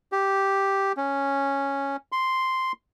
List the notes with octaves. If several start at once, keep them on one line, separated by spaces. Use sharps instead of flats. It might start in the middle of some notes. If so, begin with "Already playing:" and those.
G4
C#4
C6